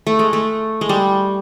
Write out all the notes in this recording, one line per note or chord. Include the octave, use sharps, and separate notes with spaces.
A3
G#3
A3
G#3
G3